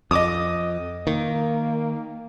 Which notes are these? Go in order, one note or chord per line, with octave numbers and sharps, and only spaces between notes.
F2 D#5 D6 D#6
D#3 A#3